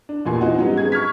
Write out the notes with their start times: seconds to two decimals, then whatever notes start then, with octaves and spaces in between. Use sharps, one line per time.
0.09 D4
0.25 A1 E2 A#2 E3 G#5 C6
0.41 C4 D#4 F4 F#4
0.58 G#2 F#3 G3 B3 C#4 D#4
0.77 G#4 G#6
0.92 C#6 F6 G#6 B6